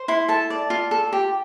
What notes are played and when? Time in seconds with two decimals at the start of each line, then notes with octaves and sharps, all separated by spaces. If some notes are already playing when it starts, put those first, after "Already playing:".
Already playing: C5
0.08 E4 C6
0.28 A4 A5
0.50 D5
0.70 F4
0.91 A4
1.13 G4